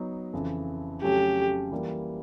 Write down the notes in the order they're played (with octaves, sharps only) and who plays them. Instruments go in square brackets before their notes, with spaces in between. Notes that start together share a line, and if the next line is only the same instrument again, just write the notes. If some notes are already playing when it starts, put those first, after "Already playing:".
Already playing: [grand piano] F#3 B3 D#4
F2 C#3 E3
[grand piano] F2 C#3 F#3 A3 C#4 [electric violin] G4
[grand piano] E3 G3 A#3